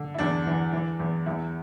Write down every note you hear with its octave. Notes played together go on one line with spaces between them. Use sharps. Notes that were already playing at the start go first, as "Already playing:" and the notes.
Already playing: D3
E4
E2 D4
E3
E3
E2
E2 E4